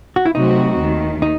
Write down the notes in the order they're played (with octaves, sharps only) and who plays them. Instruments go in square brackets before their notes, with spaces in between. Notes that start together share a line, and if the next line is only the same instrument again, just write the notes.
[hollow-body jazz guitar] F#4
E4
[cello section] C3 F#3 A3 C4 F#4 [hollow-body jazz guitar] D#4
[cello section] D#2 D#3 A3
[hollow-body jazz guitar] D#4